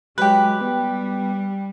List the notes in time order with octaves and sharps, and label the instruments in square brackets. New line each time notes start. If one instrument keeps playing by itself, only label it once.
[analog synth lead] F#3 [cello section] G#3 [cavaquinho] G4 B4 [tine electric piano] G5 F#6
[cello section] G3 [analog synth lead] B3